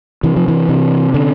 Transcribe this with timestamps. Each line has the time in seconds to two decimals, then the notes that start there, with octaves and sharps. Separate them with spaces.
0.23 C3 E3
0.36 F3
0.48 E3
0.69 C3
1.14 D3